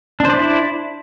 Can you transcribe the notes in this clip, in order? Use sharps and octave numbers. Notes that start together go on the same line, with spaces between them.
D4 E4 C5 D5